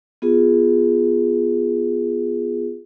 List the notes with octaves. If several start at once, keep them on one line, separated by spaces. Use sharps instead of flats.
B3 F4 G#4